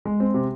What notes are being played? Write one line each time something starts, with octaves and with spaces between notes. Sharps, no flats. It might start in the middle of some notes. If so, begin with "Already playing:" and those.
G#3
C4
C3